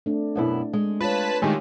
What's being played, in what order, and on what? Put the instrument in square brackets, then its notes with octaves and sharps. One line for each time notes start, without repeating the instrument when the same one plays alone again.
[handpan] A3 C4 D4
[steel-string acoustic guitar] F#2 B2 E4
G#3
[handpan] F4 C#5 [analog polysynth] B4 A5 B6
[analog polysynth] D#3 G#3 A3 [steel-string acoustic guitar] G4 G#5